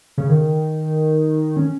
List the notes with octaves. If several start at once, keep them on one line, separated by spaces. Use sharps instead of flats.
C#3
D#3
C#4